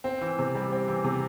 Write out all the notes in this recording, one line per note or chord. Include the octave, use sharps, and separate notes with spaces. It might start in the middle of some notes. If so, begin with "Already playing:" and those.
C4
E3
C3
G3
C4
E3
C3